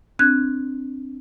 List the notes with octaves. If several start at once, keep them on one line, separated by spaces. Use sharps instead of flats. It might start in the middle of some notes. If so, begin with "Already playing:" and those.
C4 D4 F#6 G#6